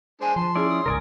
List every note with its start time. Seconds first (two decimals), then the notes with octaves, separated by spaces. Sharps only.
0.21 G#3 D4 C5 G#5
0.36 F3 A5 C6
0.55 C#4 E4 G#4 D5
0.69 D#6
0.86 C2 G#2 C#3 A#4 D5 G#5